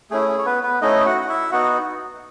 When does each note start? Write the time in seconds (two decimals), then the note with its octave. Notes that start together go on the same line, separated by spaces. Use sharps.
0.11 A3 C#4 E4 G#4
0.28 G#4
0.38 C#5
0.46 B3 B4
0.63 B3 B4
0.81 A3 C#4 D#4 E4 D#5
1.06 F#4 F#5
1.21 F#5
1.28 E4 E5
1.52 B3 D#4 F#4 F#5